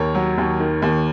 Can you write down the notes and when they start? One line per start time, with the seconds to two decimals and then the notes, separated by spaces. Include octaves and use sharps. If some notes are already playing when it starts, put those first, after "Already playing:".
Already playing: D#2 A#4 C#5
0.15 F#3
0.38 D#2
0.59 D#3
0.82 D#2